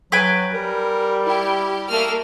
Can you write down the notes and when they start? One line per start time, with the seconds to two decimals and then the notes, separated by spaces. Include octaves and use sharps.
0.12 F#3 B4 G5 G#5
0.54 G3 A#4
1.27 E4 G4
1.88 A3 A#3 F6